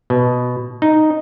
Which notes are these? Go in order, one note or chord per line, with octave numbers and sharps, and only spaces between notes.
B2
D#4